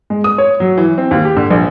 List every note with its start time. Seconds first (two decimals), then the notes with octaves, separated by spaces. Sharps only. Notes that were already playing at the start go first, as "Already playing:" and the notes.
0.10 G#3
0.24 D#6
0.38 C#5
0.60 F#3
0.78 E3
0.98 C4
1.11 D#2
1.25 G4
1.36 D3
1.50 A#1